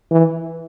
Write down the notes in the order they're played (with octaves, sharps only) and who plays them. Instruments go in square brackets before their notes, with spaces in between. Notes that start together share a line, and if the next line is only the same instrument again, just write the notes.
[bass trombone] E3